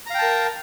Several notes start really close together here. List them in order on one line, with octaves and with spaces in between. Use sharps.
A#5 F5 G5 A5 A#4